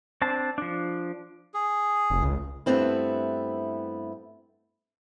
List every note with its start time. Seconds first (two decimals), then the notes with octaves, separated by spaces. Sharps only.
0.22 C4 D4 C5 A5
0.58 F3 D4
1.54 G#4
2.10 F1
2.22 C#2
2.66 G2 A#2 A3 B3 C4 E4